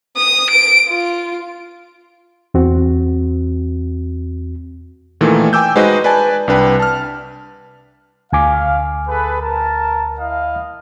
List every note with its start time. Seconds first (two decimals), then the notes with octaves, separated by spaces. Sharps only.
0.17 D#6
0.50 D7
0.89 F4
2.54 E2 C4 F#4
5.21 A#2 D#3 E3 A3
5.53 G5 G#5 D6 E6 G6
5.76 G#3 D#4 F#4 B4 C5 D#5
6.04 B4 D5 G#5 A5
6.48 C2 D4 B4 G5
6.80 A5 F6
8.33 D2 F5 G#5 D6
9.08 G#4 A4 B4
9.42 A#4 A5
10.19 E4 D#5 F5